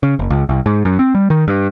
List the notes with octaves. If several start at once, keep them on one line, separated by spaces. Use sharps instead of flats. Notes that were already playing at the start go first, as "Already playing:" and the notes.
C#3
F#1
C#2
C2
G#2
F#2
C4
G3
D#3
G2